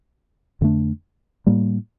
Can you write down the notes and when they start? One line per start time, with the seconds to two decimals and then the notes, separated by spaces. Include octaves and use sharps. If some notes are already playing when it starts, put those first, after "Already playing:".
0.61 F2 D3 A3 D4
1.47 A2 G3 A#3